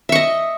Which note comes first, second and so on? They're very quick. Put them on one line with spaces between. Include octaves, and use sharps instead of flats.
E5 C#6 D#5